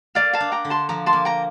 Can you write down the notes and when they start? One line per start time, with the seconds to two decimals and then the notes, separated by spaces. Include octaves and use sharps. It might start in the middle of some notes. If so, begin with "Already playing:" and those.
0.15 A#3 D5 F5
0.33 F5 A5
0.40 D4
0.52 G5 A#5
0.65 D3
0.70 A5 C6
0.89 F3 A#5 D6
1.06 A5 C6
1.13 A#3
1.25 G5 A#5